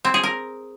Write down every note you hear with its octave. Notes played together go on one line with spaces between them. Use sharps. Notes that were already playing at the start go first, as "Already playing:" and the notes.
C4
G#4
A#4